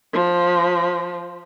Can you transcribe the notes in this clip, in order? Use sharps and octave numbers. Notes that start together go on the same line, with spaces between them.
F3